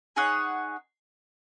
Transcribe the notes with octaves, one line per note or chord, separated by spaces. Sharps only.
D#4 G#4 C#5 F#5